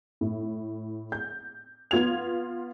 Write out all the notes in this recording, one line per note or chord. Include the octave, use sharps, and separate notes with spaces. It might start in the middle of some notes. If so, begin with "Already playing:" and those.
A2
G6
B3 F4 G#6 F7